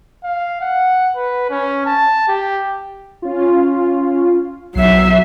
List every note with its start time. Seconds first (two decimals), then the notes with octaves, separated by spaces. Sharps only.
0.24 F5
0.61 F#5
1.16 B4
1.50 C#4
1.86 A5
2.28 G4
3.22 C#4 F4
4.75 B1 F#3 E5 C7